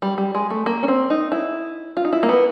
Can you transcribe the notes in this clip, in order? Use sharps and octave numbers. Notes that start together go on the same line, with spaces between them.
G3
G3
G#3
A3
A#3
C#4
C4
D#4
E4
F4
D#4
E4
A#3
B3